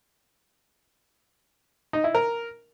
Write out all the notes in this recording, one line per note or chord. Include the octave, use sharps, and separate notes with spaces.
D#4
E4
A#4